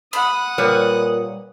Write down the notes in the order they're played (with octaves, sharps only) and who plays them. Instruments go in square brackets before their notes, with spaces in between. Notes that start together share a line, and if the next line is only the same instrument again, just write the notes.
[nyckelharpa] F#5 D#6 [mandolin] B5
[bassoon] A#2 [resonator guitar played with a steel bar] G3 B4 C#5